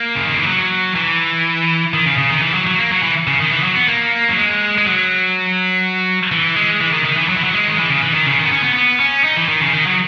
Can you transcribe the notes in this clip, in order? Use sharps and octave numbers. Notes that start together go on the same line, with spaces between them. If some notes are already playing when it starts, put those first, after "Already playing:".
Already playing: A#3
C#3
D#3
E3
F#3
E3
D#3
C#3
C#3
D#3
E3
F#3
F#3
A#3
F#3
E3
C#3
D#3
E3
F#3
B3
A#3
F#3
G#3
G#3
F#3
E3
G#3
E3
D#3
D#3
E3
F#3
E3
F#3
G#3
D#3
E3
C#3
E3
D#3
C#3
D#3
B3
C#4
B3
B3
C#4
D#4
E3
D#3
C#3
D#3
F#3